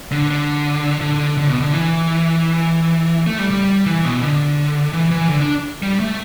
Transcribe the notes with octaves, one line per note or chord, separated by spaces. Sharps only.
D3
D3
D3
D3
B2
D3
E3
A3
G3
G3
E3
B2
D3
E3
E3
D3
D4
G3
A3